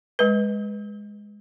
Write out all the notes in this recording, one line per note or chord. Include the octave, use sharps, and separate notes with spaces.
G#3 B4